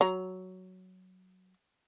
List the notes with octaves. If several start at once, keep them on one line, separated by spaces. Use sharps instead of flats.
F#3 A#5